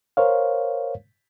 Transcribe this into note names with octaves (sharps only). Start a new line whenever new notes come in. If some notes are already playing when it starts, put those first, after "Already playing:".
A#4 C5 C#5 F5